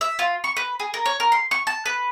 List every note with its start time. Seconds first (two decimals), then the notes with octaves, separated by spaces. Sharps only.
0.01 E5
0.19 F4
0.44 C#6
0.57 B4
0.80 G#4
0.94 A#4
1.06 C#5
1.20 A#4
1.32 C6
1.51 C#6
1.67 A5
1.86 B4